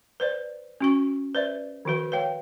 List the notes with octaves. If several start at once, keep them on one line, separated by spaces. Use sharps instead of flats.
B4 C5 D5
C#4 F#4 C#6
B4 C5 D5 E5
D#3 F3 F#4 B4
B4 C#5 F5 G5